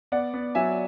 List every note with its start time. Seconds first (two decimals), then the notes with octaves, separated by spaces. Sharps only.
0.12 B3 D5 F#5
0.34 B3
0.55 F#3 E5 G#5